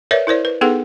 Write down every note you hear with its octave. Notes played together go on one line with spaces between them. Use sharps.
A#4 B4 C#5 D5 E5
E4 A#4 C5 D5
B4
B3 D#4 G#4 A4 B4 F#5